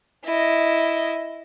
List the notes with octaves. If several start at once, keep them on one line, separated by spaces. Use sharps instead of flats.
E4 D#5